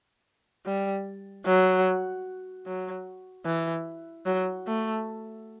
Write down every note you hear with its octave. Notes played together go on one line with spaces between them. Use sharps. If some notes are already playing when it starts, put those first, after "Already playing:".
G3
F#3
F#3
E3
F#3
A3